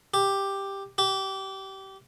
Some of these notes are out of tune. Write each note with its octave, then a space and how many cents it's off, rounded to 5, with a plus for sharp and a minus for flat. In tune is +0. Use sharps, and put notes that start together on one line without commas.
G4 +5
G4 -25